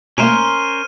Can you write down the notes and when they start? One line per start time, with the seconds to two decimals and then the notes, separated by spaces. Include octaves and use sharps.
0.18 B2 A3 A#3 C#4 A#4 C5 F6 D#7